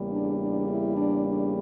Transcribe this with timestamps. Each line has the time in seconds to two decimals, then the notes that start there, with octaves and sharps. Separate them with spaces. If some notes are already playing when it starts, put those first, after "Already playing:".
Already playing: E2 C#3 G3 A#3
0.09 D4
0.38 D4
0.67 E4
0.96 D4
1.25 D4